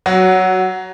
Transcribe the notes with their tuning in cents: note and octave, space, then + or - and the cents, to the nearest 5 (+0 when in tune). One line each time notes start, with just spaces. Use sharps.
F#3 +15 F#4 +0